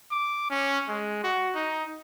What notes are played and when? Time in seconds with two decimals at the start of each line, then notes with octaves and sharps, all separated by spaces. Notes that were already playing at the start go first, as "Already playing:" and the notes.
0.11 D6
0.51 C#4
0.89 G#3
1.24 F#4
1.55 D#4